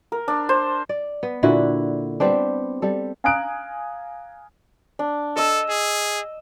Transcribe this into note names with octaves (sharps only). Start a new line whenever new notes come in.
A#4
D4
C5
D5
B3
A#2 D3 E4 F#4
G3 B3 C4 D4
G3 A4
F5 G#5 A#5 D#6 F#6 D7
D4
A4 D#5 E6
G#4